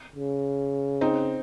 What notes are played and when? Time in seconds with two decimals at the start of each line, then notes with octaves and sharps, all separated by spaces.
0.16 C#3
1.01 C4 D#4